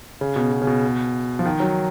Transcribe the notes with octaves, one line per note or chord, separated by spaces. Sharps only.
C#3
B2
B2
C#3
B2
F3
D#3
F#3